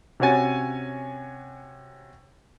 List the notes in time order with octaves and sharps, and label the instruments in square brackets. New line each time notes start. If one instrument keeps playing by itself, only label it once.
[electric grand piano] C3 C#4 F#4 C#5 G#5 A6